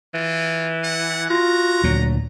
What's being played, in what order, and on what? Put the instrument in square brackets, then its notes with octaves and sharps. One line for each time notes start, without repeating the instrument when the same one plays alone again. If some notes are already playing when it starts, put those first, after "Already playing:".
[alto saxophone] E3 [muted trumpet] F4
[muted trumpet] F#5
[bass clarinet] F4 [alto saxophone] F#4 [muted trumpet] A#5
[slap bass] D2 A#2 [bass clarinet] F#3